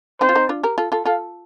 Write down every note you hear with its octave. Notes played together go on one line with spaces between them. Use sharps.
C4 D#4 C5
F4
C4 D#4
D4 F4
G4 A#4
F4 A4
F4 A4
F4 A4 F5